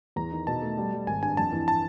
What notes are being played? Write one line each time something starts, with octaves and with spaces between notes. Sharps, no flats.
E2 A#5
D#3
B2 A5
A3
G3
G3
G#1 G#5
G2 G#5
F2 A5
E3
A5